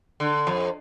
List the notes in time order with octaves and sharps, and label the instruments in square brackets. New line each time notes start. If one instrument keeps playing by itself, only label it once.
[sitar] D3
F2